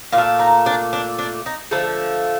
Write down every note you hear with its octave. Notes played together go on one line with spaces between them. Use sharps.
A#2 F4
A3
D#4
D4
D4
D4
D#4
D3 F3 A3 A4